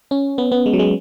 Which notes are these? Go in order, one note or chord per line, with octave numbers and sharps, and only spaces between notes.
C#4
B3
B3
G#3
F#3
G#3